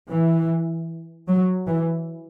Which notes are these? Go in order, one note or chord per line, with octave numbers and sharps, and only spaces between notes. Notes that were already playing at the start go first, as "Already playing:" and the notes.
E3
F#3
E3